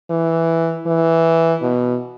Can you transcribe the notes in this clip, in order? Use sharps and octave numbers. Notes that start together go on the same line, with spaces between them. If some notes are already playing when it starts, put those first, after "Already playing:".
E3
E3
B2